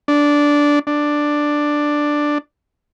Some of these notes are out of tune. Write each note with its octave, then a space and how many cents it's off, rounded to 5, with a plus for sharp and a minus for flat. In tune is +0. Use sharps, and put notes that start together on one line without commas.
D4 -10
D4 +5